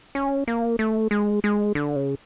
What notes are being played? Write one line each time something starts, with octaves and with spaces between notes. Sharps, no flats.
C#4
A#3
A3
G#3
G#3
D3
C#3